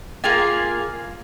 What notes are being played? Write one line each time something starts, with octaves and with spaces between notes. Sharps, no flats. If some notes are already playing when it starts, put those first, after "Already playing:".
A#3 F4 G#4 G#5